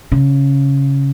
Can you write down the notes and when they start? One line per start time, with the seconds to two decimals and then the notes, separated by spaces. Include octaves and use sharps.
0.12 C#3